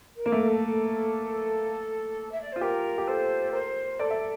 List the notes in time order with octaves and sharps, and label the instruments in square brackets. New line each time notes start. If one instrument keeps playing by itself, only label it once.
[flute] A#4
[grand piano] A#3
A3
[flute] A4
E5
D5
[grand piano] F4 [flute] C5
[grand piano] G4 [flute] A#4
[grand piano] G4
[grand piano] A4 [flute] C5
[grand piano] A#4 [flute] C5
[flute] A4 [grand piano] D5
[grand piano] E5